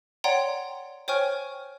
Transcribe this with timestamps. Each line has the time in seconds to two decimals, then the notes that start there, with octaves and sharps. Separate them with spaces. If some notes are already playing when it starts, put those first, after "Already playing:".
0.24 C#5 D5 F#5 G5 A#5 C6
1.08 C5 C#5 G5 G#5 C#6 F6